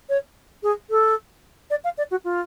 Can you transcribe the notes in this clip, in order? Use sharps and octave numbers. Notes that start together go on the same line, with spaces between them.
C#5
G#4
A4
D5
F5
D5
F#4
F4